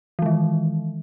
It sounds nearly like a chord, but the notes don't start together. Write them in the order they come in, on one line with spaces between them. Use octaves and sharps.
E3 G#3 D#3